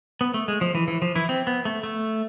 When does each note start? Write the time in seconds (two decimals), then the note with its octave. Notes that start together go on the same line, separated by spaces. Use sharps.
0.21 B3
0.34 A3
0.48 G#3
0.61 F3
0.75 E3
0.88 E3
1.02 F3
1.15 E3 E4
1.29 C4
1.47 B3
1.65 A3
1.83 A3